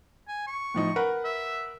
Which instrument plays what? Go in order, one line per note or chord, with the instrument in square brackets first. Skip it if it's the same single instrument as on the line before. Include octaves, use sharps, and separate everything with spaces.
[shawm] G#5
C#6
[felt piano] A2 F3 D#4
A#4 B4 F#5
[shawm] E5